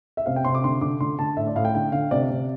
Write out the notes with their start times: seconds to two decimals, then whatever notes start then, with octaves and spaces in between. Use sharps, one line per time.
0.17 E5
0.26 C3 F5
0.36 G5
0.45 C3 C6
0.55 D6
0.64 D3 C6
0.81 D3 D6
1.01 D3 C6
1.19 D3 A5
1.37 A2 E5
1.47 D5
1.55 A2 F5
1.65 G5
1.75 D3 G5
1.92 D3 F5
2.11 C3 D5
2.30 C3